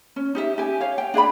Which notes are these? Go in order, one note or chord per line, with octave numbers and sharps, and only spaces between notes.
C#4
D#4 G4 E5
G4 G#5
C#5 F5
G5
D4 G#4 E5 B5